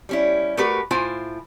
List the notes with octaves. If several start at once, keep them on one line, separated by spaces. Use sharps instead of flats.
G3 C#4 E4
A3 F#4 G4 A#4 B4
A2 E4 F4 C5 G#5